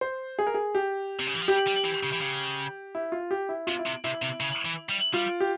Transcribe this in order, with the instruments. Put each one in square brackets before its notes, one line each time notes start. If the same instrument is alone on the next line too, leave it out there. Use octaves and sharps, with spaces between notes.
[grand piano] C5
G#4
A#4
G#4
G4
[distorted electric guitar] C3
C#3
E3
F3
[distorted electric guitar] G3 [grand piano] G4
[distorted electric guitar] G3
E3
C#3
E3
C#3
[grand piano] E4
F4
G4
E4
[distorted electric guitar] C3 [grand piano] F4
[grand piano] E4
[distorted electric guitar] C3
[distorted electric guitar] C3 [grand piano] E4
[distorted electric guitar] C3
C#3
E3
G3
[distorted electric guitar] G3 [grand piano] F4
[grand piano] G4